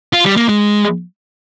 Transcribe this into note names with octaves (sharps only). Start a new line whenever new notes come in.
F4
G3
A#3
G#3